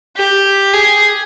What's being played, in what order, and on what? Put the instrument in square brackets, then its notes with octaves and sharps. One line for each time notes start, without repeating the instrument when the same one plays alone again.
[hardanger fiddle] G4
G#4